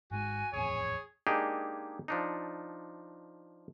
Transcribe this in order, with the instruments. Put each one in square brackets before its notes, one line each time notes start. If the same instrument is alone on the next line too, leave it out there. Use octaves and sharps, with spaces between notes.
[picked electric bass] G#1 G#2 G#3 [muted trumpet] F#4 [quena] G#5
[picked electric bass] D#1 A1 F2 [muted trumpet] G#4 [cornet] C#5
[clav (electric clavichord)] G#3 A#3 D4 D#4 G4 G#4
F3 D4 D#4